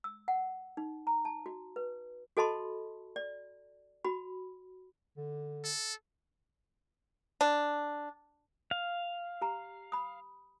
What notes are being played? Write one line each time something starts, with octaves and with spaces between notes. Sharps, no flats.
E6
F#5
D#4
A#5
A5
F#4
B4
F#4 A4 D#5 A5 B5 C6
D5
F#4 B5
D3
A4
D4
F5
G4 A#5
B5 D#6